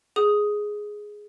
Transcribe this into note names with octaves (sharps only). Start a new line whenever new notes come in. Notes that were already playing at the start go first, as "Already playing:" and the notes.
G#4 D#6